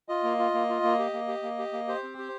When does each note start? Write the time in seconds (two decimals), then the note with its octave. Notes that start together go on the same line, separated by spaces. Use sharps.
0.09 F4 D#5
0.23 A#3
0.39 F4
0.54 A#3
0.69 F4
0.83 A#3
0.99 G4
1.13 A#3
1.28 G4
1.43 A#3
1.59 G4
1.73 A#3
1.88 G4 C5
2.03 C4
2.18 G4